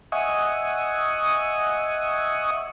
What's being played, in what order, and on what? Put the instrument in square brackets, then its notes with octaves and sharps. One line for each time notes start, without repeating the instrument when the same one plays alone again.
[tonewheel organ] D#5 E5 F#5 G#5 C#6 D#6